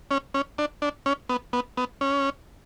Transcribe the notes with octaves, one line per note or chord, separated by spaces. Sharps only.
C#4
C#4
D4
D4
C#4
B3
B3
B3
C#4